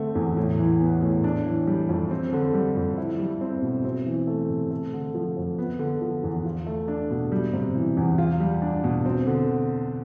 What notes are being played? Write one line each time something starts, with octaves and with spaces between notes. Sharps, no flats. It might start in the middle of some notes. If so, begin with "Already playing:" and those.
Already playing: D3 A3 C4
E2
A2
E3
B3
A2
D4
E3
G3
F2
C4
D3
G3
F2
E4
G3
C4
B2
C4
E3
A3
C3
A3
D3
F3
F2
B3
D3
F3
E2
F4
A3
D4
B2
G3
C3
E3
E2
F4
G3
D4
B2
C4
D3